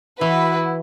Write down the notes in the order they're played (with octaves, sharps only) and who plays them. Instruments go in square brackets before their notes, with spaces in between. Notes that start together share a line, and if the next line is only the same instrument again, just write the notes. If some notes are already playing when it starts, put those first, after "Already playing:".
[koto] E3 [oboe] E4 [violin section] F#4 B4